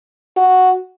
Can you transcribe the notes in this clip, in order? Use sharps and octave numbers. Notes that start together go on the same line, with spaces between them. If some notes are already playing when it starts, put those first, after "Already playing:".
F#4